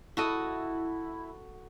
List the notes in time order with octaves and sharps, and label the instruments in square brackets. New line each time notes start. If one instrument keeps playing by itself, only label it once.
[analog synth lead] E4 [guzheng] F#4 A4 D#5